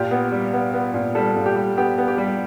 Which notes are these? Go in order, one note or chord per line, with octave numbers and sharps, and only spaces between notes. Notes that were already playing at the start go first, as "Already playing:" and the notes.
Already playing: A#2 G4
B3
G3
B3
B3
A#2
G3 A4
A#2
G4
G3
B3 G4
B3
G4
G3